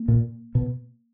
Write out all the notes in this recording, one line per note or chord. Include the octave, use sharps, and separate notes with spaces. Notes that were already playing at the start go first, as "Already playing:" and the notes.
Already playing: A#3
A#2
B2